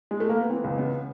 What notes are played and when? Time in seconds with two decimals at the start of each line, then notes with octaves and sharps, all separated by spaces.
0.11 G#3
0.20 A3
0.30 A#3
0.41 B3
0.50 E3 C4
0.64 C#2
0.78 C#3 B3
0.93 B3